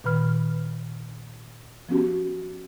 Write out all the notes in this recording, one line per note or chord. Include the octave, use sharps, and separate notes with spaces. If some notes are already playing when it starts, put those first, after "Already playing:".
A#2 D#3 B4 B5 F6
F3 B3 C#4 F#4 G4